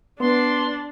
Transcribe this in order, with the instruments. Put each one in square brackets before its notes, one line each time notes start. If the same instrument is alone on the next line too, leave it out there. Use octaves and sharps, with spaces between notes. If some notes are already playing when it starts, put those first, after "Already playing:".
[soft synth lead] B3 [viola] D4 [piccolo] C6